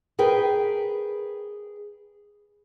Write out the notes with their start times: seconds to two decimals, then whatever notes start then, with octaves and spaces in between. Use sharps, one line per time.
0.19 G#4 A#4 B4 G5